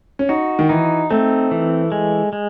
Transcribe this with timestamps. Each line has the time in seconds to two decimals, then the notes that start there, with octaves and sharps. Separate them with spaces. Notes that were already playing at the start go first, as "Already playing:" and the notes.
0.19 C#4
0.29 D#4 F#4
0.59 D#3
0.69 E3 D#4
1.10 A3 C4
1.51 E3
1.92 G#3
2.33 G#3